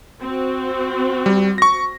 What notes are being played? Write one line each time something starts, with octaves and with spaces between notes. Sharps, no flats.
C4 F#4
G3
C#6 A#6